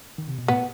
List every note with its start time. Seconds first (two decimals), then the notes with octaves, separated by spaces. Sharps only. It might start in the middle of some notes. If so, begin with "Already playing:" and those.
0.18 D#3
0.28 C3
0.39 B2
0.48 A2 B3